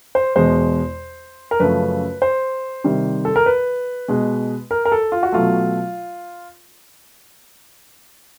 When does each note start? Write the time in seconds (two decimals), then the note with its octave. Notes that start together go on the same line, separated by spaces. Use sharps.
0.15 C5
0.36 E2 B2 G#3 C5
1.51 A#4
1.60 F#2 C#3 F3 A3 B4
2.22 C5
2.84 C3 D#3 G3
3.25 A4
3.36 A#4
3.46 B4
4.08 B2 G#3
4.71 A#4
4.85 A#4
4.92 A4
5.12 F4
5.23 F#4
5.32 B2 F#3 A3 F4